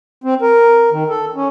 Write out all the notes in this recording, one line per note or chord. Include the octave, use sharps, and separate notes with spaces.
C4
A#4
D#3
A4
C#4